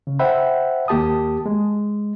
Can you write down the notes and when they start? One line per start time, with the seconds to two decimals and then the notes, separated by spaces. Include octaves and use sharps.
0.07 C#3
0.19 C5 E5 F#5 G5 B5
0.88 D#2 A#3 G4 A5 D#6
1.46 G#3